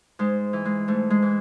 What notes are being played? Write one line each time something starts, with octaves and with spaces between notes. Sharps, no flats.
G#2 G#3
E3
G#3
G#2 A3
G#3
E3